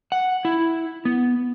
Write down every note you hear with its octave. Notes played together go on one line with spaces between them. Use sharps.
F#5
E4
B3